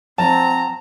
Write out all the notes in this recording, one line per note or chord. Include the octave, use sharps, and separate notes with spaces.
F3 C4 D5 F#5 A5 A#5